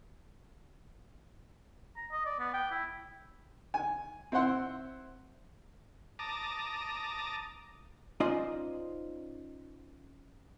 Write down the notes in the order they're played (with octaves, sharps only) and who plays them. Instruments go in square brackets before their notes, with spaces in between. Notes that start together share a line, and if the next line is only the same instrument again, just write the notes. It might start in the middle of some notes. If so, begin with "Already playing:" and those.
[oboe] A#5
D#5
D5
B3
G5
E4
[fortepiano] G#5
C4 E4 C5 F#5 C6
[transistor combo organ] A5 A#5 D6 D#6
[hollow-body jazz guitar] C#4 D#4 F4 C5 D5 D#5